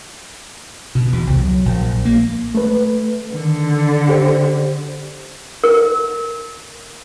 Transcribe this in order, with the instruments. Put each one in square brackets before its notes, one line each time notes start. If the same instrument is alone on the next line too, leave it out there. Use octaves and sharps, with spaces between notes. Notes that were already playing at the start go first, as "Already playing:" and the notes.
[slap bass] B2
E2
C2
F#3
A#1
A#3
[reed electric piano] A3 B4
[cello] D3 [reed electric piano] D#3
[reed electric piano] G4 C5
[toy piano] A#4